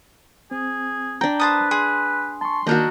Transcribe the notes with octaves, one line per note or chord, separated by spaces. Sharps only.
C4 G#4
D4 G5 A#5 G6
B4 C5 A5 D#6
G#4 C6
A5 C6 C#6
D#3 A#3 D4 F#4 A#4 D#5 G6